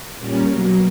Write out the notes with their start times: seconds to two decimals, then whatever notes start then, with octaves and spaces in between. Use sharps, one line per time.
0.18 A#2 G3 A#3 C#4 D5
0.49 B2 F#3 A#3